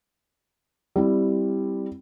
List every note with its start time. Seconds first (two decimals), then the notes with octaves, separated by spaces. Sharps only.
0.96 G3 C4 E4